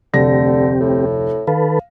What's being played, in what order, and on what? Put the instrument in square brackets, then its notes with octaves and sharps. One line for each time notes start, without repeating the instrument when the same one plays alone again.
[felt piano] F1 D2 A#6 [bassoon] D3 [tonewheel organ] C4 G4
[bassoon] A2
[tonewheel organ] D#3 A4 B4 [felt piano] F5